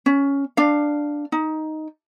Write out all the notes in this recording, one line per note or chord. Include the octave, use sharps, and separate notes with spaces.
C#4
D4 F5
D#4